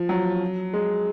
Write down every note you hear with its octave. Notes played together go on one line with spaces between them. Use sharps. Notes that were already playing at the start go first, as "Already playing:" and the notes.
Already playing: F3
F#3
G#3